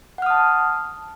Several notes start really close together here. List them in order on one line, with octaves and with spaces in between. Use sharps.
F#5 F6 D#6 A5